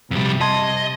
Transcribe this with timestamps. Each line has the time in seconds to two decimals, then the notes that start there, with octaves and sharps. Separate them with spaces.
0.11 F2 C3 G3
0.41 D#5 A5 C6 G#6